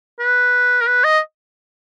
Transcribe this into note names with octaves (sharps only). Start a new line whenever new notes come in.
B4
A#4
B4
D#5